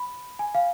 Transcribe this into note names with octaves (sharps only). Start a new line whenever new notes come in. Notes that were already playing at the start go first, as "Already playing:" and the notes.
Already playing: B5
G#5
F5